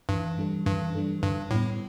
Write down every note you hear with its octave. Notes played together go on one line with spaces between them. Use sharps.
G2 E3
G3 D4 A4
G2 E3
G3 D4 A4
G2 D3
A2 G3 B3